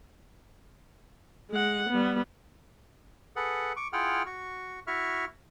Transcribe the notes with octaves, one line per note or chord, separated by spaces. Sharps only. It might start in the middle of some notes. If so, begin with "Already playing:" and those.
G#3 F#5
G3 B3
G#4 A4 B4 F#5
C#6 D6
E4 F4 G#4 F#5 G5 F6
F#4 C#6
E4 F#4 E5 C#6 F6